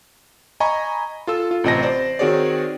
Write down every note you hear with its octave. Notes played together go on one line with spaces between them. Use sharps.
D#5 G#5 A#5 B5 C#6
F4 A4 E6
F4
A1 C3 C4 D#5 A5 A#6
C5 D5
D#3 C4 F#4 G#4 C#5 D5